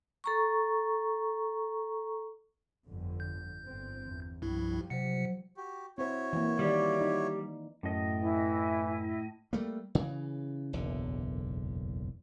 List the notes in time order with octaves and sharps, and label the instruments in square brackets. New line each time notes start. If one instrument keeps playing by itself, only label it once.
[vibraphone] A4 A#5 C#6
[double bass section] G1 F2 D3
[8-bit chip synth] G6
[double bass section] G1 C4
E2
[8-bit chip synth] C2 G2 E4 [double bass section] F3 G3
[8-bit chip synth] C3 C#7 [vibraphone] F#3 C5
[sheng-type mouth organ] F#4 G4
[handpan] C4 C5 [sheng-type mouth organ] E4 F#4 C#5
[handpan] E3 A#3
[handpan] D#3 D5 [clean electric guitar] G3
[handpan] D#4 D5
[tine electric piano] F#2 [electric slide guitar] A2 D#5
[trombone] E3 [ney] E4
[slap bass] G3 A3 A#3
C#3 E3
F#1 B1 E2 D3